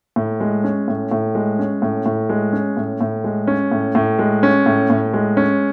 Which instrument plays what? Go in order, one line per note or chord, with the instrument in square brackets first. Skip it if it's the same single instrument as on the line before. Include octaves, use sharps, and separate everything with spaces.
[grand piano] A2
G#3
C#4
A2
A2
G#3
C#4
A2
A2
G#3
C#4
A2
A2
G#3
C#4
A2
A2
G#3
C#4
A2
A2
G#3
C#4